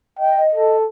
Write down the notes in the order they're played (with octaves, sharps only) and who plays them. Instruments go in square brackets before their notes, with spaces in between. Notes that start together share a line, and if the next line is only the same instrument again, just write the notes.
[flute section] D#5 [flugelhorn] G5
[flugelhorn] A4